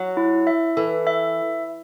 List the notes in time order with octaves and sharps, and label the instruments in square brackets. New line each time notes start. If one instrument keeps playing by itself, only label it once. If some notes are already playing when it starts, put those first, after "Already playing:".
Already playing: [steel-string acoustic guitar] F#3
[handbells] E4
E5
[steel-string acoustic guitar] E3 [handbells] A4
[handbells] E5